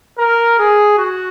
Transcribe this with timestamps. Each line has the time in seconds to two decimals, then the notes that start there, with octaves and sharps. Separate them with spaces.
0.18 A#4
0.58 G#4
0.98 F#4